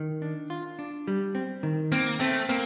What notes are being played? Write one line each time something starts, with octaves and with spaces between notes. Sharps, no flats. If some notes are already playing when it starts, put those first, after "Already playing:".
Already playing: D#3
D4
F4
D4
G3
C4
D#3
A#3 C4
A3 C4
A#3 C4